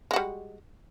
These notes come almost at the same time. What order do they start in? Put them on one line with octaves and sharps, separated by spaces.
G#3 F#4 G3